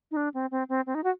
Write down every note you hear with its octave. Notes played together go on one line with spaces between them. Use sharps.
D#4
D4
C4
C4
C4
C4
D#4
F#4